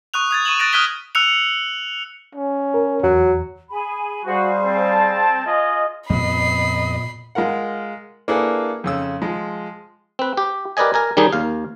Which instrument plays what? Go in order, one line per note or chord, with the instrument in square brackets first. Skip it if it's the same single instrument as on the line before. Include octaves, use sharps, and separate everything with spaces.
[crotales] C#6 D#6 F#6 F7
D#6 G#6 A6
C#6 D#7 E7 F#7
F#6 A6 A#6 D7
D#6 F6 F#6 G#6 B6 G7
E6 F#6 C#7 F7
[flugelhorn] C#4
[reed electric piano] A#4
[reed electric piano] E2 [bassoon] F#3
[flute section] G#4 G#5 B5
[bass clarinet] G3 [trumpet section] F#4 [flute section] G#4 C5 F5
[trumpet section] C4 A5
F4 G#4 D#5
[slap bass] F2 B3 [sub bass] A#2 [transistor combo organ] D#5 [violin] B5 C7
[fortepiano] G#3 F4 A#4 F#5
A#3 D4 E4 G#4 A4 B4
F2 C#3 E6
F3 G#3
[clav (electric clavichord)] C4 B4
G4
G4 A#4 B4 D5 D#5 G#5
A#4 G#5 A#5
D#3 G3 D4 D#4 G#4
D#2 F5